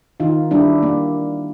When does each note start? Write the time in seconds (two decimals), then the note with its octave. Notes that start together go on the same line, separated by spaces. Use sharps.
0.20 D#3 D#4 F4
0.51 G3 D4 E4
0.83 A#3